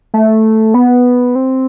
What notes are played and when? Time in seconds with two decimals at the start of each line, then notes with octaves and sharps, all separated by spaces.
0.14 A3
0.74 B3
1.35 C4